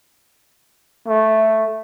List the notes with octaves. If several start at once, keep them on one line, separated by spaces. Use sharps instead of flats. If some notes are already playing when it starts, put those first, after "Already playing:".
A3